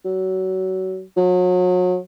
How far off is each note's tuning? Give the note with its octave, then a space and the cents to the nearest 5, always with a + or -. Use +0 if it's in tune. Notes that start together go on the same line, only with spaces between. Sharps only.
F#3 +25
F#3 -35